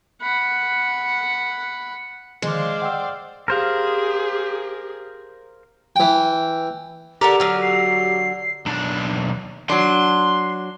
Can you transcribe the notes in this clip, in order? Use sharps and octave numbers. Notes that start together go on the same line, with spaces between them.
F#5 B5
D3 D#3 F3 G#3 C5 D5 F5
F#5 G5 E6
G4 G#4 A#4 C5 F5
E3 G5
D3 G4 A4 A#4
D3 F#3 F6
C7
B1 D4
F#3 D4 C6